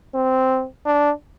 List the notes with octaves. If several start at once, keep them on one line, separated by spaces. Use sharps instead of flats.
C4
D4